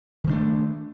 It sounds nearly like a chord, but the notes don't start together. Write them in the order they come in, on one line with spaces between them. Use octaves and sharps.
D#3 G3 D4 A3